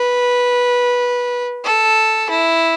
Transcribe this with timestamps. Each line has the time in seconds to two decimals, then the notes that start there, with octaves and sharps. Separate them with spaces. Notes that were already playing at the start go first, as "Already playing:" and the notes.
Already playing: B4
1.65 A4
2.30 E4